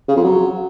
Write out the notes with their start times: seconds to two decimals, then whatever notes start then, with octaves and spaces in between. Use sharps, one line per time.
0.08 C#3
0.16 F2
0.24 F#3